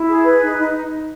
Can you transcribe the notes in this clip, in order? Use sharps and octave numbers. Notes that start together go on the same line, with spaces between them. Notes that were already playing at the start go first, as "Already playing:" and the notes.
Already playing: E4
G#4
B4
D#4
D#4